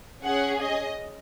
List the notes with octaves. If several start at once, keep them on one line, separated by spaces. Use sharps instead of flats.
C#4 G#4 F#5
D#5